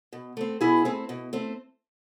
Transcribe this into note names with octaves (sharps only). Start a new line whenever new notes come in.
B2
A3 C4
B2 E4 G#4
A3 C4
B2
A3 C4